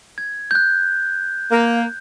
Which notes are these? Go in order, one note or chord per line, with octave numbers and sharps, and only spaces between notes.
G#6
F#6 G6
A#3